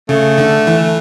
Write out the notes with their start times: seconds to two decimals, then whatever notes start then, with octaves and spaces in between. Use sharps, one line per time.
0.09 C#3 A3
0.38 D3
0.67 E3